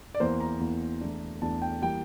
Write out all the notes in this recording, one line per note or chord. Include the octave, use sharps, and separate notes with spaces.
D5
E2 E3 A#3 C5
A#5
E2 E3 A#3
E2 E3 A3 D4
E2 E3 A3 D4 A5
G5
E3 G3 A#3 G5